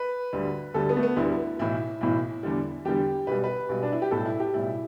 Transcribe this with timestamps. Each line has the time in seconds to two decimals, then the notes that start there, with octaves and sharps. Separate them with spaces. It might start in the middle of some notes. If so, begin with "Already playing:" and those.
Already playing: B4
0.33 D2 D3 G3
0.74 D2 D3 G3 A4
0.89 B3
0.97 A3
1.03 B3
1.17 D2 D3 G3 E4
1.59 B1 A2 E3 E4
2.01 B1 A2 E3
2.43 E2 D3 G3
2.85 E2 D3 G3 G4
3.27 B1 B2 G3 B4
3.44 B4
3.69 B1 B2 G3
3.83 D4
3.92 E4
4.02 G4
4.11 B1 A2 G3 A4
4.26 E4
4.40 G4
4.53 B1 A2 G3 E4